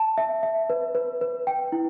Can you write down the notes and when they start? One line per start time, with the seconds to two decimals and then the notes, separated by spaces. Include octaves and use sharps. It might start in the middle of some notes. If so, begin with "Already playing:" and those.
Already playing: A5
0.18 E5
0.43 E5
0.70 B4
0.95 B4
1.21 B4
1.47 G5
1.72 E4